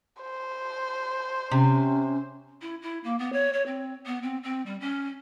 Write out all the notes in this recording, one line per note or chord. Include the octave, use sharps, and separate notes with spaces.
C5
C3 C#4
E4
E4
A#3
B3
C#5
C#5
C4
B3
C4
C4
G3
C#4